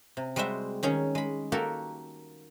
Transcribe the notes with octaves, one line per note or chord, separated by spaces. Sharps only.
C3
G3 G#3 F#4 C5 E5
D#3 C#4 G#4 C#5
G#3 B5
A#3 F#4 G4 A4 A#4